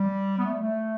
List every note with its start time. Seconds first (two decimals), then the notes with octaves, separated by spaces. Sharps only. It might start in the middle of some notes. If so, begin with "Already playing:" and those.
Already playing: G3
0.38 B3
0.45 A3
0.52 G3
0.60 A3